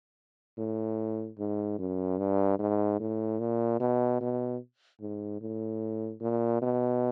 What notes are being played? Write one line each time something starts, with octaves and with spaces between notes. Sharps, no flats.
A2
G#2
F#2
G2
G#2
A2
A#2
B2
B2
G#2
A2
A#2
B2